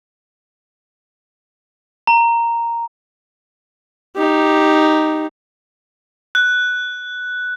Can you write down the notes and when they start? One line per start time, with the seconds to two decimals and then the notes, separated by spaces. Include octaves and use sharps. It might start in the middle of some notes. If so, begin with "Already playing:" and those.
2.07 A#5
4.16 D#4 G4
6.35 F#6